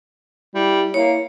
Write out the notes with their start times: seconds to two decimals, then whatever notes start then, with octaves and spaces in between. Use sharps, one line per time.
0.55 G3 E4
0.94 A#3 E4 C#5